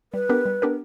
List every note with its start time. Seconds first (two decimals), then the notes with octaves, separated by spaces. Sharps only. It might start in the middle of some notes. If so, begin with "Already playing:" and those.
0.13 G3 B4
0.29 B3 D4 G4 A#4
0.46 G3
0.62 B3 D4 G4 A#4